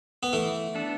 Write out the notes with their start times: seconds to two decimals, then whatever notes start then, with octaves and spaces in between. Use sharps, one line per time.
0.23 B3
0.33 E3 A3
0.75 B3 D4 A4